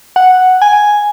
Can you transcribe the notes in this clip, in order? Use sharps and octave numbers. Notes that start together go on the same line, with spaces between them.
F#5
G#5